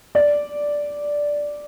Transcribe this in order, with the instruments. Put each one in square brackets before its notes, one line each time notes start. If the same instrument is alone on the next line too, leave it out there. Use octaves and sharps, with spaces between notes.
[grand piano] D5